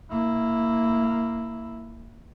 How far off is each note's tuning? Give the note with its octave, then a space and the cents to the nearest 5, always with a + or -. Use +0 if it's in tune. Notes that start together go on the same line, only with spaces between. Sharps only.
A#3 -15 E4 +0